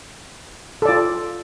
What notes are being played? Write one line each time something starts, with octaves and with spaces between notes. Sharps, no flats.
F4 A4 D5